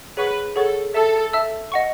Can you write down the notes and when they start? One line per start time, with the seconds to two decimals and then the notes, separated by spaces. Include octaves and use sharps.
0.17 G#4 B4 C#5 F#5 C#6
0.56 G#4 A4 C#5 F#5 C#6
0.94 A4 E5 A5 E6
1.33 E5 A5 E6
1.72 D#5 F#5 C#6